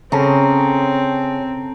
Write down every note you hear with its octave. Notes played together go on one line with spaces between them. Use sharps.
C#3 C4 C#4 A4 A#5